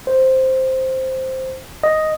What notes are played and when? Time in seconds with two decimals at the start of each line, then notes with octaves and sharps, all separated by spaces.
0.07 C5
1.83 D#5